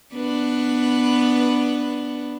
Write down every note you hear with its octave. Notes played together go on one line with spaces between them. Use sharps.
B3 D4 B4